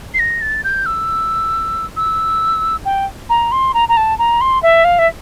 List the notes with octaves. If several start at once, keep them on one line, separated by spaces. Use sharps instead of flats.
C7
A#6
A6
G6
E6
E6
G5
A#5
C6
A#5
A#5
A5
A#5
C6
E5
F5
E5